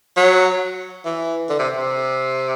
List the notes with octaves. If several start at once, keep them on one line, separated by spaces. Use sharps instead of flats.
F#3
E3
D3
C3
C3